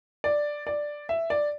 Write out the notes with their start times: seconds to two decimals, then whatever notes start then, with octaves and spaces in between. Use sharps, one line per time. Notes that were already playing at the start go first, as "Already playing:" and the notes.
0.24 D5
0.67 D5
1.09 E5
1.30 D5